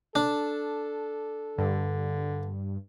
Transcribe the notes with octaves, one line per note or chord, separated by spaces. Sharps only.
D4 A4
G2 D3